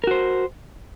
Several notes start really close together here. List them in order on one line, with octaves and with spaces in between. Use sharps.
A#4 F#4 C5